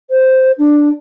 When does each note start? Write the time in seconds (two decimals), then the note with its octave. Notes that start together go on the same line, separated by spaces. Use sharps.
0.10 C5
0.58 D4